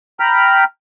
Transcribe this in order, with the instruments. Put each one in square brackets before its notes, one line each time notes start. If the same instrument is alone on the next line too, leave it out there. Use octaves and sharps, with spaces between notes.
[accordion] G5 A#5 B5 F6